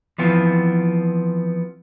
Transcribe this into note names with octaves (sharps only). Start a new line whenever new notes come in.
E3 F3 B3 C4